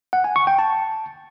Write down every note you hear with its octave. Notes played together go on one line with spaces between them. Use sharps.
F#5
G#5
C#6
G5
A5